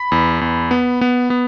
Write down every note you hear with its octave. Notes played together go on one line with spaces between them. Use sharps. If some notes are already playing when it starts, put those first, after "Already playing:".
Already playing: B5
E2
E2
B3
B3
B3